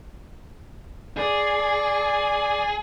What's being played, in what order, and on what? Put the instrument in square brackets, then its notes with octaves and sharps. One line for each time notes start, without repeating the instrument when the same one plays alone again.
[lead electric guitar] G#4 [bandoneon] D5